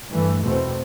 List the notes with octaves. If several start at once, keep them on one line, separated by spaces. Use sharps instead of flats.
G2 E3 A3
E2 B2 A3 C4